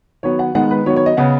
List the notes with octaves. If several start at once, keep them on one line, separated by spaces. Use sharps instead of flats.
D#3 F#3 B3 C#5
F#5
D#3 G#3 B3 F#5
B4
D#3 F#3 B3 C#5
C#5
D#5
C#3 B3 F#5